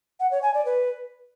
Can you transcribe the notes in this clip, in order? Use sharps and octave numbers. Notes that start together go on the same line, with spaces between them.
F#5
C#5
G#5
D5
B4